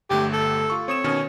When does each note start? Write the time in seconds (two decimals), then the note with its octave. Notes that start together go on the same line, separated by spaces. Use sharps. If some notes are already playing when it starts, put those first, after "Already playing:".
0.10 G1 D3 A3 G4
0.33 A4
0.70 F4 C#6
0.88 C4 C#5 D#6 E7
1.04 B2 D#3 C#4